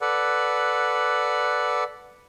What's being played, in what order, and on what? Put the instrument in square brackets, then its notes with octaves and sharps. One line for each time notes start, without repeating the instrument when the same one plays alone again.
[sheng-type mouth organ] A4 B4 D5 F#5